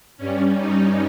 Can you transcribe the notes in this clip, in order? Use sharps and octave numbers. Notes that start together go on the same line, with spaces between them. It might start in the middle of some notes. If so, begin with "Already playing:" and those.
G2 G3 C#4
D#4